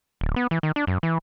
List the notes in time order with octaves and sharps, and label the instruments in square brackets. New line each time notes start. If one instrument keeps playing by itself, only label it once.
[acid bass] D1
B3
E3
D#3
D4
F#2
E3